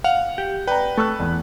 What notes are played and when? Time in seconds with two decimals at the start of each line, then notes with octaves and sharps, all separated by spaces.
0.04 F5 F#5
0.38 G4
0.68 B4 D5 G5 A#5
0.98 A3 C#6 E6 F#6
1.20 E2